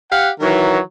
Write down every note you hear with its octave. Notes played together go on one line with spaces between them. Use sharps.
G4 F5 F#5
D#3 E3 F#3